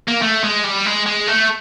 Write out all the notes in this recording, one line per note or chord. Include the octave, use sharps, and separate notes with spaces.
A#3
A3
G#3
G3
G#3
G#3
A3